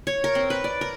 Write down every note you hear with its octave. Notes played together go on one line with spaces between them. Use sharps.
C#5
A#4
C4
B4
D5
A#4